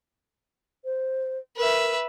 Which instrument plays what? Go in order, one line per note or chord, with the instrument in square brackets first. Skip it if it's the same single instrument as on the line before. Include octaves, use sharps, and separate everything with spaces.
[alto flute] C5
[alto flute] A#4 [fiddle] B4 E5